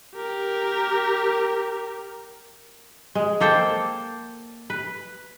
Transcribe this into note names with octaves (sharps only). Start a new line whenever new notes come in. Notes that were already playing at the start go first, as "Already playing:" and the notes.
G4 A#4
G#3
A#3 A4 C5 G5
B4